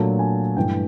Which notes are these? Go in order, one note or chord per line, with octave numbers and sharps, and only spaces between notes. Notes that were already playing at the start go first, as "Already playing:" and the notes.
Already playing: A#2 F#3 A3 D4 A5
G#5
G2 E3 A3 G5